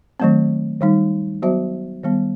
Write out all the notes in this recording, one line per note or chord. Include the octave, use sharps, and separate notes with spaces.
D#3 F#3 A3 C4
D#3 G3 D#4
F#3 B3 F#4 C5 E5
D#3 G3 B3